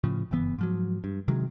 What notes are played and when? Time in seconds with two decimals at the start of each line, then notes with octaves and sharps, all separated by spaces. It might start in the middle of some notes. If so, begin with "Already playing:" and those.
0.04 A2 C#3 F3
0.31 F#1 G2 E3 B3
0.58 G#2 F3 F#3
1.04 G2
1.28 C3 D#3 F#3 G#3